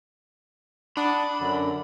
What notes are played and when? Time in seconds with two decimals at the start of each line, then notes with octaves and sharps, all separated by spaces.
0.97 D4 F#5 A5 B5 D#6
1.40 F#2 D3 F#3